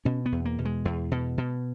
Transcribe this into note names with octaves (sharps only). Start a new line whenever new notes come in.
B2 C#4
B3
E2
A#3
B2
G#3
E2
B2
B2